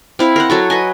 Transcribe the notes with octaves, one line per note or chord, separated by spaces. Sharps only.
C4 E4 F5
A#4 C5 F#5
F#3 A4 C#5
B4 D#5 G#5